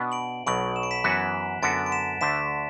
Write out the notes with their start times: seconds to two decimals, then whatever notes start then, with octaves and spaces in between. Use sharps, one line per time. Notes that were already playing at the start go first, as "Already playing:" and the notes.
Already playing: B2 B3 D4
0.12 D7 F#7
0.46 B1 B2 F#3 D7 F#7
0.76 E7
0.83 D7
0.91 B6 E7
1.04 F#2 E3 B3 F#4 F#6 B6
1.62 F#2 D3 B3 F#4 A6 D7
1.86 D7
1.92 B6 E7
2.21 D2 D3 A3 D4 B6 E7